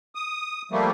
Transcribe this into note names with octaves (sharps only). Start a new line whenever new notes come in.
D#6
F3 G3 A3 A#3